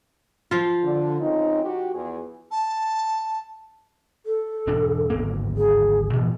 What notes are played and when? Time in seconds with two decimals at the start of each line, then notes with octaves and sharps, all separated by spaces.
0.51 F3 F4
0.84 D3
1.21 C#3 C4 D#4
1.64 F#4 G4
1.93 E2 G#4
2.51 A5
4.26 A4
4.67 E1 G#2 D4
5.10 D1 G#1 A#3
5.57 G#4
6.13 A#2 E3 F3